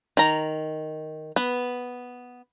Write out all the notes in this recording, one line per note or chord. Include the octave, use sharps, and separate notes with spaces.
D#3 A#5
B3